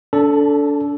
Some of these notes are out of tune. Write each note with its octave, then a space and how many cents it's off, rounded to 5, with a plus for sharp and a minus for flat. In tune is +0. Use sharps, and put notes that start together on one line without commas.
D4 -30 A4 +0 A5 +20